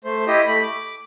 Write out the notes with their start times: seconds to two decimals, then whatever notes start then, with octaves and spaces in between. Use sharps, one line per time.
0.04 A3 C5
0.27 E4 G4 D#5
0.47 A3 B5
0.62 D6